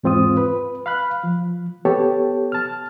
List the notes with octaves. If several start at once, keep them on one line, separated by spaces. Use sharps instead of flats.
E2 G#2 C4 F4 D#6
B4
F5 B5 F#6
F3
B3 G4 A4 C#5 G5 A5
A5 F6